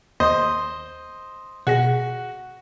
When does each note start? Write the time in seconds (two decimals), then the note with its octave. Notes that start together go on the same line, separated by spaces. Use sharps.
0.20 D#2 C5 D#5
1.67 B2 F#4 G#4 A#6